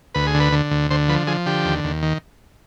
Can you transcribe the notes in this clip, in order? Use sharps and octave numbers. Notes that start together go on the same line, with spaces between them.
D2 B4
G#4
D3
B4
D3
D2
D3 C5
F3 B4
F3 G#4
D3 G4
D#2
D#2
D#3